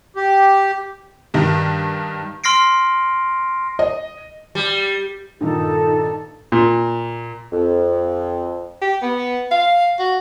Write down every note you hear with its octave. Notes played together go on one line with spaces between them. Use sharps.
G4
G2 D#3 G3
C6 F6 A#6 C7 D7
D#5
G3
G2 A#2 D#3 D#4 A4
A#2
F2
G4
B3
F5
F#4